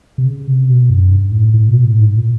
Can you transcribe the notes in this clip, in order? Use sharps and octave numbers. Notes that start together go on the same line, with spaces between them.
C3
C#3
C3
B2
F#2
G2
A2
A2
B2
A2
G#2
A#2